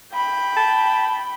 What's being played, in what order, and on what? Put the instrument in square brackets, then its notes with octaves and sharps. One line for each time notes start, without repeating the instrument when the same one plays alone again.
[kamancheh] G5 B5
[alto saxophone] A5